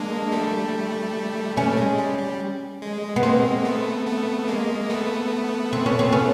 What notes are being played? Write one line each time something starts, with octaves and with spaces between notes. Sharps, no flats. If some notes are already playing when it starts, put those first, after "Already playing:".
Already playing: G#3 A#3 D4
G3 A3
G3 A3 C#4
G#3
G3
G3
G#3
B3
G#3 A#3 C4
A3 B3
A3 B3
G#3 A#3
A3 B3
C4
C#4
C4
C#4